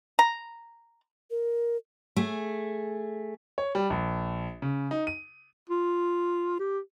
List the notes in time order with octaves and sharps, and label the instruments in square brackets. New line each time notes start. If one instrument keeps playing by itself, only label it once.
[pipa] A#5
[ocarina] A#4
[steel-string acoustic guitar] A3 G#4
[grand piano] C#5
G3
A#1
C#3
D#4
D#7
[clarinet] F4
G4